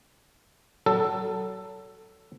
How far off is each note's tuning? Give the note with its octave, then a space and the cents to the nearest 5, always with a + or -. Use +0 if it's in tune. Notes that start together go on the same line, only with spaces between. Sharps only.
F#3 +35 A4 +10